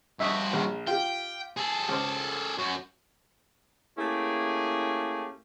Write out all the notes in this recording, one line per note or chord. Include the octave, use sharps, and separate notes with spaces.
G2 F#4 D#5 E5
A#1
F4 G4 G5
G#4 A4
C#2 C5
F#2 F#4
A3 A#3 C#4 E4 G4 G#4